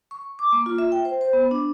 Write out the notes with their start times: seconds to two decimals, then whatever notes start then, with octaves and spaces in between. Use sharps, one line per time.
0.11 C#6
0.39 D6
0.52 A#3
0.66 F4
0.78 E5
0.92 G5
1.05 C5
1.21 C5
1.33 B3
1.51 D4